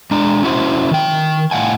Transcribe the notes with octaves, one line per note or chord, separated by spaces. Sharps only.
G#3 D4 A#5
C#4 E4 F#4 C5
D#3 G5
A2 F5 F#5 G#5